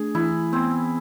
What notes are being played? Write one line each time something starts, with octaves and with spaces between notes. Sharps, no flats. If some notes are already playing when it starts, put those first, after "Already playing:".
Already playing: A3 D4 G#4
E3 E4
B3 C4